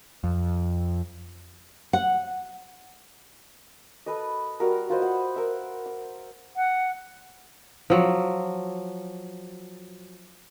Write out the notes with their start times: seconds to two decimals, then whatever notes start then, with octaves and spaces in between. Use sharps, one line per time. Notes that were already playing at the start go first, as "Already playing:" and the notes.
0.24 F2
1.93 F#5
4.06 A4 B4 D#5
4.60 G3 F#4 A#4
4.89 F4 B4 C5 D#5
5.02 F#5
5.36 A#4 E5
5.86 D6
6.56 F#5
7.90 F3 F#3